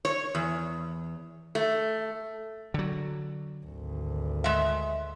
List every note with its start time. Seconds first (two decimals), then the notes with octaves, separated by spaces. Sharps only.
0.05 C#5
0.35 E2
1.55 A3
2.74 D3 F#3
3.65 G#1 D2
4.44 G#3 E5